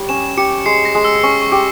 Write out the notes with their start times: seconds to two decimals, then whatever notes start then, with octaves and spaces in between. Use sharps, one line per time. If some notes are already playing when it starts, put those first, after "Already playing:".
Already playing: G3 C#5
0.09 C#4 E7
0.37 G4 C#7
0.66 G#3 C7
0.85 A#6
0.95 G#3
1.05 E6
1.23 C#4 C#6
1.42 C#6
1.52 G4